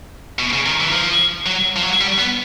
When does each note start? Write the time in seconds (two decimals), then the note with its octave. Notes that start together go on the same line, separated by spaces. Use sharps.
0.39 B2
0.53 C#3
0.66 D#3
0.80 E3
0.92 F3
1.46 F#3
1.76 F3
1.82 F#3
2.01 G3
2.19 B3